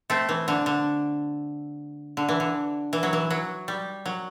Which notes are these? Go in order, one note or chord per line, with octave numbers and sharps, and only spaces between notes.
A3 C4
E3
D3
D3
D3
E3
D3
E3
F#3
E3
F#3
G3
F#3